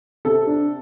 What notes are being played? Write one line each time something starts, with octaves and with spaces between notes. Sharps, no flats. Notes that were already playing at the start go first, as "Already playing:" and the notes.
C3 A4
D4